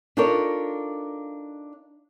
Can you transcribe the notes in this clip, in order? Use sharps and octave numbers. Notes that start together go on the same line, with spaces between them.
D4 D#4 F4 A4 A#4 C#5